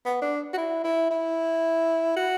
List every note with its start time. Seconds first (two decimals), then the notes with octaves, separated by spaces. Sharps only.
0.05 B3
0.22 D4
0.53 F#4
0.57 E4
0.84 E4
1.11 E4
2.16 F#4